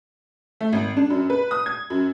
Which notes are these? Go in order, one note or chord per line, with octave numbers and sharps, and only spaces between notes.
A3
G#1
D4
F#2
B4
D#6
G#6
F#2